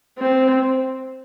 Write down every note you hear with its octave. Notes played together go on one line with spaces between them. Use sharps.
C4